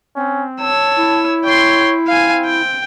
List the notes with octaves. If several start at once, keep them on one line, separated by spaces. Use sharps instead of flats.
C4 C#4
C#5 A5 E6
E4
C#5 G5 C6
C4 F5 G#5
G5